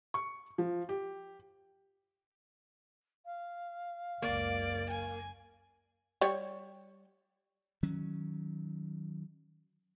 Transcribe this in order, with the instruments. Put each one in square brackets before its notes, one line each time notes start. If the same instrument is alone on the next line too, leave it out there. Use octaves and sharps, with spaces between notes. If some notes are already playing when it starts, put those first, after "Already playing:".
[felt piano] C#6
F3
G4
[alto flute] F5
[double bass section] F#1 C#2 [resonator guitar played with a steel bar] A#3 [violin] D5
[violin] G#5
[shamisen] G3 C#5
[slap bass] D#3 F#3 C#4